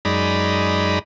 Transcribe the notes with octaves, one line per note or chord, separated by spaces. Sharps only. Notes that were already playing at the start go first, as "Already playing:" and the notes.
F#2 G#3 D#4 D5 B5